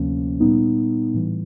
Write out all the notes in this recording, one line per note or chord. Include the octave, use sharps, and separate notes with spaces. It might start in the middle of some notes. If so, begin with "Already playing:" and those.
Already playing: D2 C3 F3 A#3 C#4
A#2 G3 B3 D#4
A2 E3 G3